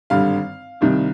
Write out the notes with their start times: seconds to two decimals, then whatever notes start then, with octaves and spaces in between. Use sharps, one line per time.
0.10 G#1 G2 D3 G3 F5
0.81 C2 C3 D#3 G3